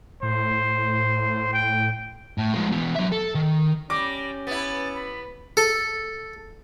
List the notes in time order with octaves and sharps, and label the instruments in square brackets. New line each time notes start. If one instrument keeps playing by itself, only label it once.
[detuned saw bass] A2 [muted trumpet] C5
[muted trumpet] G5
[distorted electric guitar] A2
F3 G#3
B2 E3
F#3 E5
A4
D#3
[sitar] G3 [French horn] C#4 [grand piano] D6 [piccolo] A#6
[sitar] B3 E4 [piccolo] A6
[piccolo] B5
[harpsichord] A4